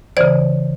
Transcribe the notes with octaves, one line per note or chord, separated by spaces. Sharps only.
C#3 E3 C5 D5